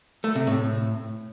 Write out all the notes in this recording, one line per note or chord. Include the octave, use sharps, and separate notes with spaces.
A3
C3
A2